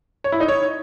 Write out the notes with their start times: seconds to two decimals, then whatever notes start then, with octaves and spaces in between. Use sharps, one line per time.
0.24 C#5
0.32 E4
0.40 D#4
0.48 C#5